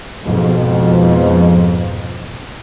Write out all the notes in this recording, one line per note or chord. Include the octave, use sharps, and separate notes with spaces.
F2 G#2 B2 F3